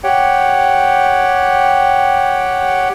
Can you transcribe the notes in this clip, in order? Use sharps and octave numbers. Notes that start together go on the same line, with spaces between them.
G4 C#5 F#5 G5